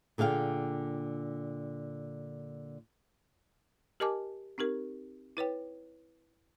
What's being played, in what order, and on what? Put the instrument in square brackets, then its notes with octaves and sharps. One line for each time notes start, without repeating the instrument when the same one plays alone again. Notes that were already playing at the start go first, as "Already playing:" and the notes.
[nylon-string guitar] A#2 D3 G#4 F5 G5
[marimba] G4 A#4 D#5 G#5 A5 D6
C4 D#4 G4 A#4
E4 B4 C#5 G5